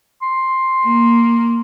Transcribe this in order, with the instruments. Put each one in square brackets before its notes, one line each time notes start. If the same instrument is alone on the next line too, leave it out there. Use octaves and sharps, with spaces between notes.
[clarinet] C6
[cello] A#3